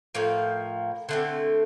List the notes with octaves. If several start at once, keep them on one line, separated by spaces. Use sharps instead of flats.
A2 F3 A#3
D3 A3 C4